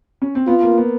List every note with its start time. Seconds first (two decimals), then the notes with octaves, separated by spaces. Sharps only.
0.22 C#4
0.35 C4
0.47 B3 F4
0.63 A#3
0.78 B3